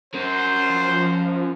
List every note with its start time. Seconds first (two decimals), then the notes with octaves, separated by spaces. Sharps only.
0.14 C#4 A#4 C5
0.69 F3